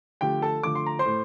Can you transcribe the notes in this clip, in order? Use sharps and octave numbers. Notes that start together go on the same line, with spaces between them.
D3 F3 A3 G4 G5
A4 A5
D3 F3 A3 D6
C6
A#5
C5 C6
A2 A3